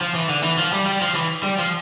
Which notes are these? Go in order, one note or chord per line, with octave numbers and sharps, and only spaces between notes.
F3
E3
D3
E3
F3
G3
G3
F3
E3
G3
F3